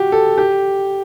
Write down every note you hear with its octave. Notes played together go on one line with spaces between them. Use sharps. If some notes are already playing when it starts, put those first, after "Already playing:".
Already playing: F#4 G4
A4
G4